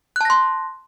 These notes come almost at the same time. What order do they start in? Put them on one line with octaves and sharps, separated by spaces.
F#6 A5 A#6 C6